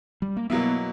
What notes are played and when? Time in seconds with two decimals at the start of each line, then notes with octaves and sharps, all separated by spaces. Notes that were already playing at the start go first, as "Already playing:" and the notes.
0.22 G3
0.37 A#3
0.50 B2 F#3 A#3 B3 E4